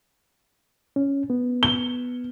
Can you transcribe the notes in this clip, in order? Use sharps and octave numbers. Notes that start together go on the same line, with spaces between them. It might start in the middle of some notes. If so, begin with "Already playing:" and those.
C#4
B3
G7